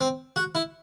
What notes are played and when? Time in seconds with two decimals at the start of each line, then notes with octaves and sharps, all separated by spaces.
0.01 C4
0.36 F#4
0.55 E4